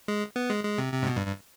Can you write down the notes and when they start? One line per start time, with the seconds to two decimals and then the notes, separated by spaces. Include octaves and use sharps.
0.08 G#3
0.36 B3
0.50 G#3
0.64 G#3
0.78 C3
0.93 C3
1.02 G#2
1.07 B2
1.17 G2
1.27 G2